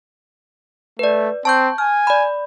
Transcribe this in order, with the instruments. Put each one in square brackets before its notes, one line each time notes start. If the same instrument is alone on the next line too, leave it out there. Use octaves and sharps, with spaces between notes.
[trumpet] A3 [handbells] B4 D5
[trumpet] C4 [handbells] A5 C#6 G6
[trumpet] G#5 [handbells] F6
[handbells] D5 B5